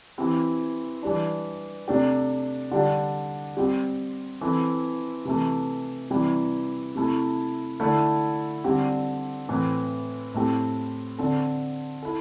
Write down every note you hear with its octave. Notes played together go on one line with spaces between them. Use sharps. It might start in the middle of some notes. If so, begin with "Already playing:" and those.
E3 C4 E4 G4
E3 G3 D4
C3 A3 D4 G4
D3 G3 D4 G4
G3 C4 G4
E3 C4 E4 A4
C3 E3 A3
C3 E3 G3 E4 G4
C3 A3 E4 A4
D3 A3 E4 A4
D3 G3 C4 G4
A2 E3 C4
A2 A3 C4 G4
D3 C4 A4
E4 A4